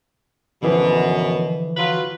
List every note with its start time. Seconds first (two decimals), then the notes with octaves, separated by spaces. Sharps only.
0.63 F#2 B2 D3 E3 F3
1.77 F#3 F4 B4